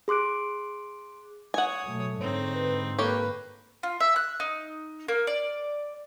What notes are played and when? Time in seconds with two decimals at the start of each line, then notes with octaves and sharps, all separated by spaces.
0.08 G#4 C6 D6 F#6 D7
1.54 C#5 F#5 G#5 D#6
1.87 B2 F#3 A3
2.21 G#2 D3 C4 D#4 C#5
2.55 B4
2.99 A#3 G4 A4 B4 C#5 G5
3.83 F4
4.00 E5
4.16 F#6
4.40 D#4
5.08 A#3
5.27 D5